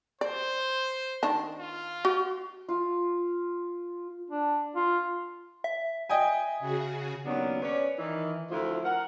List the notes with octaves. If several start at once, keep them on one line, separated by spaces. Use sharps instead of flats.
C5 D5
D#3 D4 A5
F4
F#4
F4
D4
F4
E5
D#5 G5 G#5
C#3 F#4 G#4
D#2 F#3 B3 C#4 D4
C#4 B4 C#5 D5
D#3 E3
D2 F3 E4
A#4 F#5